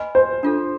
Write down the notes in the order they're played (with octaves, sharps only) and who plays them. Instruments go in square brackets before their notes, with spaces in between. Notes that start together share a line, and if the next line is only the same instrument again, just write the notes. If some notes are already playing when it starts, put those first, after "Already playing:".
Already playing: [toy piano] B4 D#5 G#5 B5
[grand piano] C5
[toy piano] D4 F4 A4